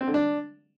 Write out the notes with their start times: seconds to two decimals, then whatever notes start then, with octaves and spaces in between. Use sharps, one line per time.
0.01 C4
0.07 D3
0.14 D4